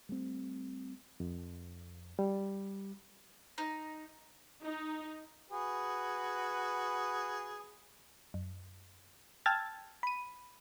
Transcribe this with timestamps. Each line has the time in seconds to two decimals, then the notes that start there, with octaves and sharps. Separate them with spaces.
0.09 G3 A3 C4
1.20 F2
2.19 G3
3.58 D#4
4.63 D#4
5.50 F#4 G#4 B4
8.34 F#2
9.46 G5 A5 E6 F6 G#6 A6
10.03 B5 D#7